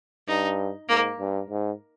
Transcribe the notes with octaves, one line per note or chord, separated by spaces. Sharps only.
G2 D#4
G#2 A#3
G2
G#2